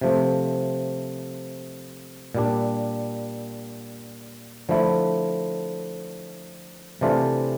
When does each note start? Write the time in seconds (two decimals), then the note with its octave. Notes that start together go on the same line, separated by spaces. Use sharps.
0.01 C3 F3 A3
2.35 A#2 G3 D4
4.69 D3 F3 A3 E4
7.01 C3 E3 A3 D4 F4